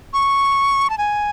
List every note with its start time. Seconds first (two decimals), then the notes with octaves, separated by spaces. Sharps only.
0.14 C#6
0.90 A5
0.98 G#5